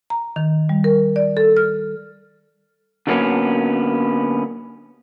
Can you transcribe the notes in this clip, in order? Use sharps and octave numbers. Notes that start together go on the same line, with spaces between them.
A#5
D#3
G3
A#4
D5
A4
F6
D3 F#3 G3 A#3 B3 C#4